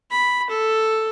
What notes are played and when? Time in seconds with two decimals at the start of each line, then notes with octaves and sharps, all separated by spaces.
0.11 B5
0.50 A4